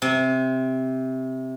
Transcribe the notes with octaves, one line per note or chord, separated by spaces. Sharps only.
C3